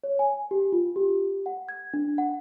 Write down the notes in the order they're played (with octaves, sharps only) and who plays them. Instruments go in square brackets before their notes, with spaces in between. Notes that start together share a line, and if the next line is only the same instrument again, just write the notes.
[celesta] C#5
G#5
G4
F4
G4
F#5
G#6
D4
F#5